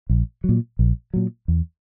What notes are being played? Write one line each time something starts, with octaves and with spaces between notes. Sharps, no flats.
A#1
A#2 F#3
A#1
A#2 F#3
E2